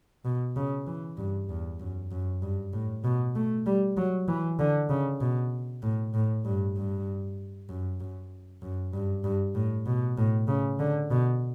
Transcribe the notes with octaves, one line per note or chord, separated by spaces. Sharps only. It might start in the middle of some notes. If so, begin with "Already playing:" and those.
B2
C#3
E3
G2
E2
F#2
F#2
G2
A2
B2
A3
G3
F#3
E3
D3
C#3
B2
A2
A2
G2
G2
F#2
F#2
F#2
G2
G2
A2
B2
A2
C#3
D3
B2